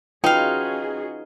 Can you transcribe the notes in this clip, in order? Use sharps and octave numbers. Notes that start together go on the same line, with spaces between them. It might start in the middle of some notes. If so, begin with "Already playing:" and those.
C#4 D#4 F4 F#4 G#4 B4 F5 G5